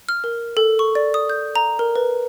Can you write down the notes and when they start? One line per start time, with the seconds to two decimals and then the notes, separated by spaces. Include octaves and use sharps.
0.09 F6
0.24 A#4
0.57 A4
0.79 C#6
0.95 D5
1.14 D#6
1.30 G6
1.55 A#5
1.79 A#4
1.96 B4